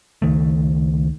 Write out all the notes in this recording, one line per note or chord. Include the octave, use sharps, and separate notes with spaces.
C#2 D#3 A3